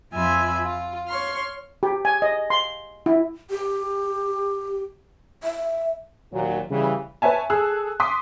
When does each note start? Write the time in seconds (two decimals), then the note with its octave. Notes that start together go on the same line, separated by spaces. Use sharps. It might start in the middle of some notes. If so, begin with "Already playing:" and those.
0.12 F2 F4 E5 G#5 B5
0.65 F4
1.07 C#5 C6 F6
1.83 G4
2.05 G#5
2.22 D#5
2.50 C6
3.06 E4
3.50 G4
5.44 E5
6.33 D#2 A#2 F#3
6.71 C#3 E3 G3
7.22 B4 C#5 E5 G#5 A5
7.50 G#4 A4 E6 F#6
8.00 C6 D6 D#6 B6